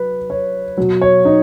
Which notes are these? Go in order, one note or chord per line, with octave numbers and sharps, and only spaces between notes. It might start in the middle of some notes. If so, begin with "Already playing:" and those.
Already playing: F#3 B4
C#5
B2 F#3
C#5
D#4